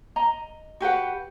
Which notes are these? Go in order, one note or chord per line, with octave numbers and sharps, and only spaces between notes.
D#5 A#5
F#4 G4 B4 F#5